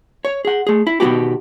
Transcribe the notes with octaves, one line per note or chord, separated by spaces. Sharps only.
C#5
G#4 F#5
A3 G#4
E4
B2 D#3 F#3 B3 F#4 G4